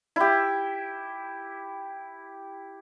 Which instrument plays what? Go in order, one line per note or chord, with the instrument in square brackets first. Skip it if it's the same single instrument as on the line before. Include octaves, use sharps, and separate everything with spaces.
[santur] E4 G4